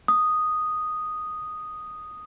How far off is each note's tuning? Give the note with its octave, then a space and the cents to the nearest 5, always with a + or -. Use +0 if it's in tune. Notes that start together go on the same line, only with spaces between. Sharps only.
D#6 -5